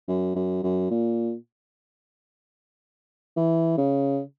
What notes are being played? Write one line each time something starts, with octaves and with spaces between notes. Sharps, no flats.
F#2
F#2
F#2
A#2
E3
C#3